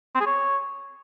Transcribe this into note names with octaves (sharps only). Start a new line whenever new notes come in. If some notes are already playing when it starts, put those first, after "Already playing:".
C4
G#4
C#5